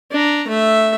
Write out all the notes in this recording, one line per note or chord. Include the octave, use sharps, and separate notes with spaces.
D4 A#5
A3 E5